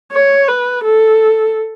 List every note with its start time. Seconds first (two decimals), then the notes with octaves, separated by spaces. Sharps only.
0.12 C#5
0.48 B4
0.84 A4